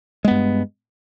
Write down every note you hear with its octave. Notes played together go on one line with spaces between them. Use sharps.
G2 G#3 B3